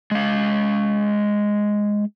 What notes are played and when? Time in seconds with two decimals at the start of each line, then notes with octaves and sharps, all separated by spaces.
0.11 G#3 F5